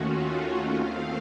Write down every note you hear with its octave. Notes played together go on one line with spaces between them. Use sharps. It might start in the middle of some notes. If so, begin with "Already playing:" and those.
Already playing: D#2 D#3 A3 C#4 F4 F#4
F#4
D#2 D#3 A3 C4 F5